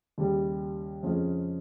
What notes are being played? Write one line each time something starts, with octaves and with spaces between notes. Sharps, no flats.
D#2 C#3 G3
F2 C#3 G#3 C#4 F4